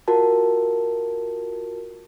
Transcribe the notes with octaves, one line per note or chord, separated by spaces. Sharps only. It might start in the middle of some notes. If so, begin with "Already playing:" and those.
F4 F#4 A#4 A5